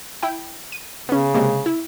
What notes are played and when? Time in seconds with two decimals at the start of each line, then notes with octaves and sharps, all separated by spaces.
0.23 E4 G5
0.72 D#7
1.09 C#3 B3 C#4
1.34 C3 G#3 A#3
1.66 E4